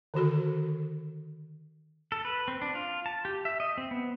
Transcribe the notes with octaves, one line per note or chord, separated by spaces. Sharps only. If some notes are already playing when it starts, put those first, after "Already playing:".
D3 D#3 F#4 A4
A4
B4
C4
D4
F4
A5
G4
E5
D#5
C4
B3